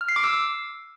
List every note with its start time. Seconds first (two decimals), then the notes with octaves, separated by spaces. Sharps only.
0.01 F6
0.09 C7
0.16 D6
0.24 E6